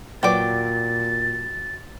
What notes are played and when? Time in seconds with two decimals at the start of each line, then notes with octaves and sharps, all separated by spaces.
0.23 A#2 F#3 B4 D5 G5 D6 A6